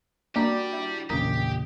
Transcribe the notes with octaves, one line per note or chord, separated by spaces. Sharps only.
A#3 D4 F#4 G4 D5 A#5 D6
E4
A#1 E2 C#3 G4 A#4 D#6